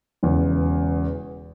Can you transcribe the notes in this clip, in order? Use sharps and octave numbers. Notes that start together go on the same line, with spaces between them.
E1 E2 C#3